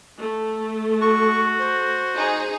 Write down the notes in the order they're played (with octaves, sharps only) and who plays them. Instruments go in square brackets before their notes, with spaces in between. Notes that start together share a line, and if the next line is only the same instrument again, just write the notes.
[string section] A3
[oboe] F#4 [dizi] C#6
[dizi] C5
[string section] D#4 G#4